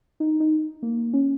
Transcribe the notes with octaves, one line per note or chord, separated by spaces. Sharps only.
D#4
D#4
A#3
C#4